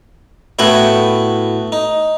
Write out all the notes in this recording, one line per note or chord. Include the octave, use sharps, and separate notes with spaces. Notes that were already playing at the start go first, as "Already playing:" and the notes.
A2 A3 B3 E4 F#4 G5
D#4